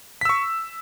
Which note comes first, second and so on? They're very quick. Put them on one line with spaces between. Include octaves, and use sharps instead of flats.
B6 E6 C#6